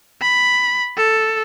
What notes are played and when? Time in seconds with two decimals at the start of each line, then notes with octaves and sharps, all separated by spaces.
0.21 B5
0.97 A4